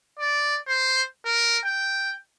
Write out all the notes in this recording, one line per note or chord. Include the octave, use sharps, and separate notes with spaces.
D5
C5
A#4
G5